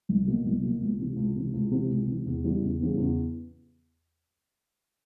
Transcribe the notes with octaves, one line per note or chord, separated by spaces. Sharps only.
C2
B2 F#3 A#3
C2
B2 F#3 A#3
C#2
C3 E3
C#2
C3 E3
C#2
C3 E3
C#2
C3 E3
E2
C#3 E3 G3 B3
E2
C#3 E3 G3 B3
E2